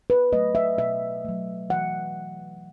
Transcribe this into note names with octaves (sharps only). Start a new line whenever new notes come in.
B4
F#3 A3 D#5
E5
B2 E5
F#3 A3
E3 F#5